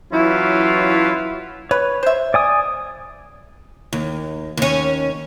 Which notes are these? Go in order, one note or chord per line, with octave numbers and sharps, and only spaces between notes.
E3 F#3 C#4 E4 F4 B4
B4 C#5
C5 E5
D5 G#5 D#6
D#2
D#2 C#4